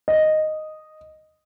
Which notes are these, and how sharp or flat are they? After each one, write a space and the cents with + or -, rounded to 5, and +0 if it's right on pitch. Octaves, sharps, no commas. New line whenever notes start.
D#5 -5